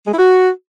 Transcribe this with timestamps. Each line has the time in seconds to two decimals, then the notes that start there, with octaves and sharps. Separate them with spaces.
0.07 G#3
0.12 E4
0.18 F#4